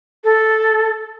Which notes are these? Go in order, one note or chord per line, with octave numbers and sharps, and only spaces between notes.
A4